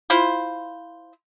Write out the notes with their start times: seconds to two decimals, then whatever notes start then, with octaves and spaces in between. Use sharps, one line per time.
0.10 E4 F4 C5